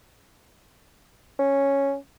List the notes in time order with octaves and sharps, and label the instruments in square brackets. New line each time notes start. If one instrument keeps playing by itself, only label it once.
[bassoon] C#4